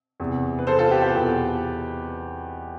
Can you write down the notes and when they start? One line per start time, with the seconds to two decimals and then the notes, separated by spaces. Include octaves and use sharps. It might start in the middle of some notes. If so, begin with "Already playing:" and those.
0.20 E2 C3 E3
0.59 B4
0.67 A4 C5
0.79 F4 A4
0.91 G4 B4
1.02 G4 B4
1.14 E2 B2